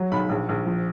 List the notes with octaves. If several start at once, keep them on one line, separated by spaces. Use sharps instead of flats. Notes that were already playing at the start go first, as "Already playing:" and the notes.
Already playing: F#3
B1 B5
A#1
A#1
F3